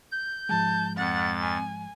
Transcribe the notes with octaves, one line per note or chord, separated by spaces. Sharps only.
G6
G#2 F3 G#3 A5
F2 F#5 A6
G#5